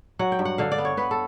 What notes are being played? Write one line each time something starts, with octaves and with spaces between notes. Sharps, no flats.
F#3 F#5
G5
G2
F#5
D3 F5
D5
B3
C#5
B3 B4
A4